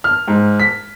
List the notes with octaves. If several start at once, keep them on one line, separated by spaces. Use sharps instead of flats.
F6
G#2
B6